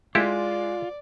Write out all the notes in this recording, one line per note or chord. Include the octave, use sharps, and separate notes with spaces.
G#3 E4 F4 G4 A4 D5